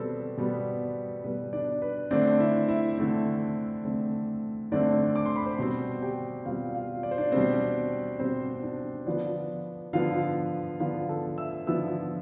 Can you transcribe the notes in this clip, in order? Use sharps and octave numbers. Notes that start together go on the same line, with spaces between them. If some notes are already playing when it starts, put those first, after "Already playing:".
Already playing: B2 G3 B3 C4 A4
B2 G3 B3
B2 G3 B3 B4
D4 D5
B4
D3 A3 C4 D4 D5
E4 E5
E4 E5
D3 A3 C4
D3 A3 C4
D3 A3 C4 D4 D5
D6
C6
B5
C5 C6
B2 G3 C4
G4 G5
B2 G3 C4 F4 F5
F4 F5
D5
C5
D4 D5
B2 G3 C4 C5
B2 G3 C4 C5
D4 D5
D3 F3 B3 D4 D5
D3 F3 B3 F4 F5
D3 F3 B3 F4 F5
A4 A5
E5 E6
D3 F3 B3 E5 E6